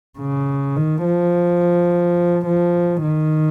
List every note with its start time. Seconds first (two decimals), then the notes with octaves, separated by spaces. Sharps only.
0.19 C#3
0.76 D#3
1.04 F3
2.46 F3
3.03 D#3